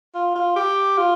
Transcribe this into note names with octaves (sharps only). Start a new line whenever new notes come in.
F4
F4
G4
F4